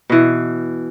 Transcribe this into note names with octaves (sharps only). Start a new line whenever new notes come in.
B2 E3